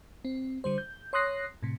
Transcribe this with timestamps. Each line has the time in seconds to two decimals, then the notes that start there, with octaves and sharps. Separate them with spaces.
0.25 C4
0.64 D3 G3 C5
0.78 G6
1.13 C#5 C6 D#6 F#6 A#6 C7
1.63 A2 C3